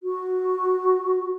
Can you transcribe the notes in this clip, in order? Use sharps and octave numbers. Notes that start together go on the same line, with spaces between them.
F#4